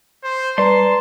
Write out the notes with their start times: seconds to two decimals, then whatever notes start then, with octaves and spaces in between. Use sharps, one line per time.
0.23 C5
0.58 G3 B4 D5 A5 A#5 C6